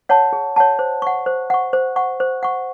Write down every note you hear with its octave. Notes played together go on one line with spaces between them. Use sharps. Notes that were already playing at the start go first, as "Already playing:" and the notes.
C#5 F#5 A5
G#4
C#5 F#5 A5
C5
F#5 C#6
C5
F#5 C#6
C5
F#5 C#6
C5
F#5 C#6